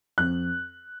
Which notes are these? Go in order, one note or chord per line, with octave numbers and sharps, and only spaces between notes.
F2 F#6